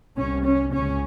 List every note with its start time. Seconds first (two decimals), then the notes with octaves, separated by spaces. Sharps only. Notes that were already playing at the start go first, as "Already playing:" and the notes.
0.16 C2 C3 C#4
0.45 C#4
0.73 C#2 C#3 C#4